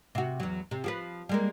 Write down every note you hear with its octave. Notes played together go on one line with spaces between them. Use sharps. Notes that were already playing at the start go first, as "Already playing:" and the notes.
C3 F#4
E2 F#3
C3
F3 G4 B4
G3 G#3 A#3